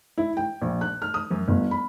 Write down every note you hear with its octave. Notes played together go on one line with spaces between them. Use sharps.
E4
G5
A#1
F#6
F6
D#6
F#2
G1
B5